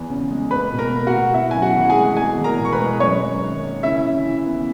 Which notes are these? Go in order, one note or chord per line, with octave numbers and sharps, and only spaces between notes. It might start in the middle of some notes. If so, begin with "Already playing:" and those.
Already playing: E2 B3
C#3
G#3
A#3 B4 B5
B2
A#4 A#5
A#3
F#4 F#5
B2
B3 E4 E5
F#2 G#5
F#4 F#5
E3 F#5
G#4 G#5
G#3
B3 G#4 G#5
E2
A#4 A#5
B2
C#6
B4 B5
G#3
F#2 C#5 C#6
F#2
D#3
A#3
C#3 E4 E5
C#3
E3
B3